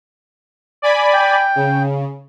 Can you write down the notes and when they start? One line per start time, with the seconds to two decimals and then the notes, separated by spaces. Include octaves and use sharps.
0.82 D5 G#5 B5
1.13 G5
1.56 C#3